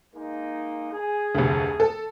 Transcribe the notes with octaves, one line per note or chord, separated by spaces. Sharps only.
G#3 A#3 D#4
G#4
F1 D2
A4